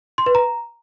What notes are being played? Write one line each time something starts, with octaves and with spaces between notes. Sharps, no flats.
C6
B4
A#5